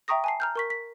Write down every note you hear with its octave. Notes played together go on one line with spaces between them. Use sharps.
E5 G5 A#5 C#6 D#6 A#6
G#5 A5 C7
A#5 F6 G6
A#4 C#6 B6
B6